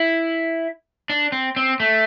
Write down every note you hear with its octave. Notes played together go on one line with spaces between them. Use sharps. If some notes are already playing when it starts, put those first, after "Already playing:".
Already playing: E4
D4
C4
C4
A3